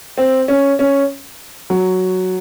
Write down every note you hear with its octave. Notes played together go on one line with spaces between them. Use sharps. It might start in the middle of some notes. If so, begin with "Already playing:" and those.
C4
C#4
C#4
F#3